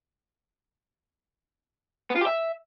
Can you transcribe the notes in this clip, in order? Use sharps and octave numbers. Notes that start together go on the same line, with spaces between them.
B3
F4
G4
E5